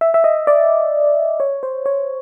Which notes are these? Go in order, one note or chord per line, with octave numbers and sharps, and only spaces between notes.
E5
E5
D#5
D5
C#5
C5
C#5